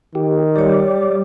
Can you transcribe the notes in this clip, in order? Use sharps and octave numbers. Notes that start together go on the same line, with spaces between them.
D#3 G4
G3 G4 C#5 D5